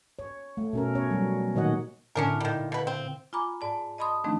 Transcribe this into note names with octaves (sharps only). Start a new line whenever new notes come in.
C#5
A3
B2 C#4 A#4
C#4 C#5
F#3 G3
A#2 D#3 F#4 C#5 D#5 F#5
A2 D3 B3 C#4 D4 A#4
A#2 D#3 G3
B2 B4
C4
F4 G#5 A#5 B5 D6
G#2 D5 A5
D#5 A5 B5 C6 D#6
D#3 F3 A3 C4 D4 D#4